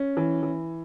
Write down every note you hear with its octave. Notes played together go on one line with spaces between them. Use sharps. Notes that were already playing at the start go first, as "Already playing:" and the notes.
Already playing: C#4
E3
E3